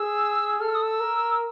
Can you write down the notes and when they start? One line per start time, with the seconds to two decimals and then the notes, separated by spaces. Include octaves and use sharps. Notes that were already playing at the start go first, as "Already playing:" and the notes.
Already playing: G#4 E6
0.60 A4 F6
0.68 E6
0.75 D#6
0.82 E6
1.00 A#4